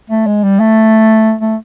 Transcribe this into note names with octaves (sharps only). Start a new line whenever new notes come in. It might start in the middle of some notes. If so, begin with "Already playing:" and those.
A3
G#3
G3
A3
A3